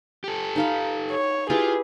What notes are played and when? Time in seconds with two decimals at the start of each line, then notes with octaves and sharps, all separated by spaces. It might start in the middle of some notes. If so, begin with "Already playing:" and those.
0.24 G4 A4
0.56 D#4 F5 B5
1.11 C#5
1.50 E4 F4 G4 G#4 B4